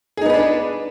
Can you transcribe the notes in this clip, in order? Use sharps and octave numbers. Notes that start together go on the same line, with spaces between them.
B3 D4 D#4 G#4 B4